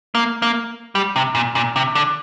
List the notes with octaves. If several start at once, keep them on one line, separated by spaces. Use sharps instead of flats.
A#3
A#3
G3
C3
A#2
A#2
C3
D3